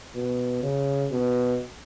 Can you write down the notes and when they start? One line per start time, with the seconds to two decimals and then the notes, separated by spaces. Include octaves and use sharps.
0.15 B2
0.63 C#3
1.11 B2